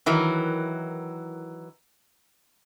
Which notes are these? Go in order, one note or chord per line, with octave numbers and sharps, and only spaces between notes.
D#3 E3 F#3 A#4